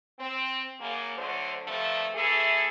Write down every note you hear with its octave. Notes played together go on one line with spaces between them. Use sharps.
C4
F#2 C#3 A#3
D2 D3 F#3 C5
G2 C3 F3 A3
E3 A3 G#4 A4